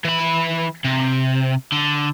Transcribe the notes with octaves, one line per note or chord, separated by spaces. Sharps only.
E3 B5
C3
D3